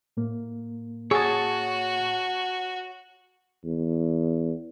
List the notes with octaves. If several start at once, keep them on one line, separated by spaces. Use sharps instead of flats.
A2 A#3
F#4 G#4 C#5 A5
E2